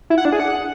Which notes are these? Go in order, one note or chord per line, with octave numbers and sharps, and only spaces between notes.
E4
F#5
D4
G#4
F#5